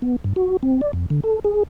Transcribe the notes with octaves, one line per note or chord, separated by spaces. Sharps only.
B3
G2
F#4
C4
D5
F2
D3
A4
G#4